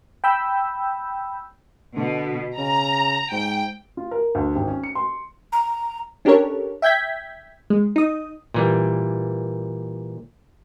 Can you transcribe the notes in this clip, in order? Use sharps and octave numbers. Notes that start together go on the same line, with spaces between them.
G5 B5 E6 G6
B2 D3
C#3 A#5
G#2 G5
F4
A#4
D2
G#1
C#4
C#7
C6
A#5
C#4 D4 G4 A4 A#4 C#5
E5 G5 G6 G#6 B6
G#3
D#4 D#6
A#2 E3 G3